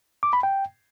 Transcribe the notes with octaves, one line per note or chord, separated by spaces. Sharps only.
D6
B5
G5